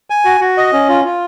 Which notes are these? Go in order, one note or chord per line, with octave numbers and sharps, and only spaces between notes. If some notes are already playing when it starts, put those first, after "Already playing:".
G#5
F#4
F#4
D#5
C#4
F4
F4